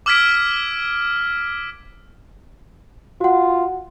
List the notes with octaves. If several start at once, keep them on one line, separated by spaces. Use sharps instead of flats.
D6 E6 F6 G#6 B6 D7
F4 F#4 F#5